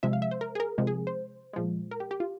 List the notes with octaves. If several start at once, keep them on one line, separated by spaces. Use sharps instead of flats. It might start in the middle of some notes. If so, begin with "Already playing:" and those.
C3 F3 G#3 E5
F5
E5
C5
A#4
G#4
A#4
C3 F3 G#3
G#4
C5
A#2 F3 G#3
A#4
G4
G4
F4